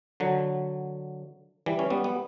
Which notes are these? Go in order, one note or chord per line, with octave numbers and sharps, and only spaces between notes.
D3 F#3
E3 G3
C#4
G3 B3
B3